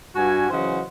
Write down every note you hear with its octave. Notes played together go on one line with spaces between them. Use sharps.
G2 F#4 G#5
C#3 E3 F#3 C5 D#5 F#5